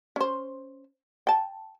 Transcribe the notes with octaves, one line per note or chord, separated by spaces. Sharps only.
C#4 C5
G5 A5